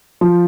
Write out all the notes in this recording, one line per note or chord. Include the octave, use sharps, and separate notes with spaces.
F3